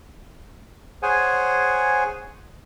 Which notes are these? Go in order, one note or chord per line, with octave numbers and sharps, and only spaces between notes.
G#4 C5 C#5 F#5 G#5